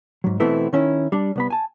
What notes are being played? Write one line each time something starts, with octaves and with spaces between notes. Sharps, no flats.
G#2 F#3
B2 E3 A3 B3 C4 E4
D#3 C#4 E4
G3 D4
C2 B3 B5
G#5 A5